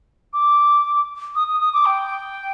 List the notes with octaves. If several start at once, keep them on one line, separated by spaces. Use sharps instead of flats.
D6
D#6
D#6
D#6
D6
G5